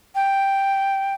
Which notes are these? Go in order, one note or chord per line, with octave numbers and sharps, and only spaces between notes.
G5